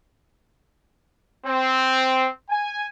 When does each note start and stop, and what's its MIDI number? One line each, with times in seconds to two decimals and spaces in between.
1.46 2.29 60
2.50 2.85 80